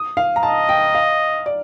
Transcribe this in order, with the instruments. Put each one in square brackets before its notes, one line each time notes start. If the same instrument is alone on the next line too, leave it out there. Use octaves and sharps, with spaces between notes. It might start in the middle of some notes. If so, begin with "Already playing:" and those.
Already playing: [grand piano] D#6
F5
A#5
[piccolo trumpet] D#5 [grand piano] A5
[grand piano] G5
F5
D5